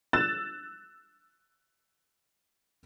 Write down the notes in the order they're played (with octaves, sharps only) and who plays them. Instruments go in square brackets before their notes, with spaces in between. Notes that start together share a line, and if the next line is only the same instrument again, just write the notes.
[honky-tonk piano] E6 F#6 A6 E7